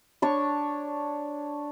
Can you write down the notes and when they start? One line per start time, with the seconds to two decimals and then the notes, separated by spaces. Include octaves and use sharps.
0.22 D4 C#5 C#6